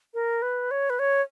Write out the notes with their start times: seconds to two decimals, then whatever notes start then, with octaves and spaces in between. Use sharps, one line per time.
0.14 A#4
0.42 B4
0.71 C#5
0.90 B4
0.99 C#5